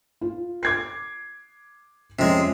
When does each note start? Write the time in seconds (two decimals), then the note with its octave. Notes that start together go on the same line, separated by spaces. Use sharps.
0.21 F4
0.63 D6 G#6 C7
2.19 F2 C3 G#3 C#4